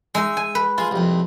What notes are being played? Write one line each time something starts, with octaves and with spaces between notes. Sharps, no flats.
G#3 D#4 E5
G#5
B4
G#3 F4
C2 F2